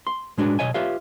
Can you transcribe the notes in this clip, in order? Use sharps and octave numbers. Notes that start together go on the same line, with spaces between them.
C6
A2 G#3 D4 F#4 B4
B1 B2 C#5 D#5 G#5
F4 G4 B4 C#5 E5 F5